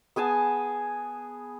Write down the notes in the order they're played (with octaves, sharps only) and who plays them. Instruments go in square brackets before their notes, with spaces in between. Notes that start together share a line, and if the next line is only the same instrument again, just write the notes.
[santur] B3 G#4 G#5 A5